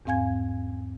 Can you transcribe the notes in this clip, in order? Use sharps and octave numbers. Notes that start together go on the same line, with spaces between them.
E2 G#2 C4 F5 G#5 G#6